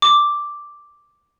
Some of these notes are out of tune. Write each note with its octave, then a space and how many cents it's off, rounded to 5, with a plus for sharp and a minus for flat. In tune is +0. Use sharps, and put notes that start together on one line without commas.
D6 +0